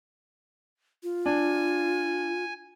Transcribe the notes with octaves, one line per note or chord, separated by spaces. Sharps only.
F4
D4 G#5